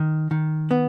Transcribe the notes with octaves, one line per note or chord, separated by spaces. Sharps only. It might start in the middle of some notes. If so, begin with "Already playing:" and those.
Already playing: D#3
D#3
B3